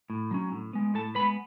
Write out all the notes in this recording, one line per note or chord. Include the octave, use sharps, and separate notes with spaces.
A2
F#3 C#4
A2
G#3 B3
A2 A4 A5
G#3 B3 B4 B5